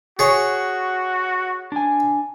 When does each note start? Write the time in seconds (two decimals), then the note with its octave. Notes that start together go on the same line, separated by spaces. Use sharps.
0.19 F#4 G#4 C#5
1.72 D4 G#5